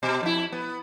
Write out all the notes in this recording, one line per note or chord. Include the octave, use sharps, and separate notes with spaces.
B2
F2 E4
B3